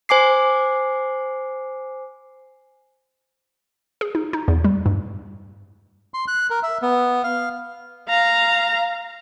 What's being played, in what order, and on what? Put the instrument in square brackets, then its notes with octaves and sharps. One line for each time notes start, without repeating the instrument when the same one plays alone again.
[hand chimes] C5 G#5 D6 C7
[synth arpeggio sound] G#4
D#4
D#4
E2
G3
G2
[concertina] C6
F#6
A#4
E5
B3
F5
[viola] F5 A#5